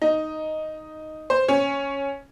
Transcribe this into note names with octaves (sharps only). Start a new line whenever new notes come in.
D#4
C5
C#4